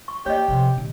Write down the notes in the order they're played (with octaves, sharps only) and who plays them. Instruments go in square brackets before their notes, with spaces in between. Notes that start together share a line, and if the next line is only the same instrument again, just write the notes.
[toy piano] C#6
[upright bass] A#3 [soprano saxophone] G4 [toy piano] C#5 D#5
[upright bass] C3 F3
A#2 D#3